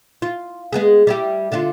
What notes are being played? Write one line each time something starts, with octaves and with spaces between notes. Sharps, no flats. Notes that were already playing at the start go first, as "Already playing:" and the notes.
F4
G#3 B3 G#4
G3 E4 G4
D3 D4 F4